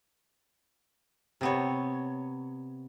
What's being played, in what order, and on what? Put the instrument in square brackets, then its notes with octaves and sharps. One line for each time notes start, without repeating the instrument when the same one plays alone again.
[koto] C3 B3 C#5